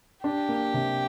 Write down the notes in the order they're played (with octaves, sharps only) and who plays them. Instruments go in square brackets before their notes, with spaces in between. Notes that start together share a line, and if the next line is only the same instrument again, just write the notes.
[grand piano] D4 [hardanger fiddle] G4
[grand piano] A#3
C3